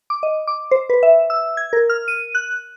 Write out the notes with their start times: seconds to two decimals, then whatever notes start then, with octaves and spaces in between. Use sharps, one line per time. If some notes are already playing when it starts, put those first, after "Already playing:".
0.10 D6
0.23 D#5
0.47 D6
0.71 C5
0.90 B4
1.03 E5
1.30 E6
1.57 G#6
1.73 A#4
1.90 F6
2.08 D#7
2.35 F#6